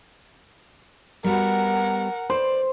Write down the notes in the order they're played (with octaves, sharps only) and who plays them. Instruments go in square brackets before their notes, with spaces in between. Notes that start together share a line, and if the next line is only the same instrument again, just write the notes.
[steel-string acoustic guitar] G3 B3 F#4 [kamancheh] A#4 F#5
[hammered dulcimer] C5 [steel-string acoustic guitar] D5